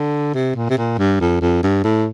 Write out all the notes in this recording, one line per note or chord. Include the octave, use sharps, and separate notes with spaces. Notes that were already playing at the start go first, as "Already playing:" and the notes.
Already playing: D3
C3
A#2
C3
A#2
G2
F2
F2
G2
A2